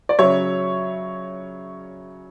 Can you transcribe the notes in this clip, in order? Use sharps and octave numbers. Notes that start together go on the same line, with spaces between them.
D5
C#3 F#3 C#5 E5